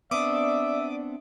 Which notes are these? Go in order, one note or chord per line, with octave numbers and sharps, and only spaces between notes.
B3 C4 D4 D5 E5 D6 D#6